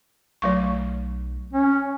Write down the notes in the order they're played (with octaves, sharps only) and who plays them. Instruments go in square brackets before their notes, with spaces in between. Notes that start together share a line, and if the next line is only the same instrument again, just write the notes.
[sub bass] B1 [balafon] F#3 A3 C#6
[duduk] C#4